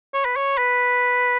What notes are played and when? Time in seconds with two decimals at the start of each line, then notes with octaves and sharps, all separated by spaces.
0.14 C#5
0.25 B4
0.36 C#5
0.58 B4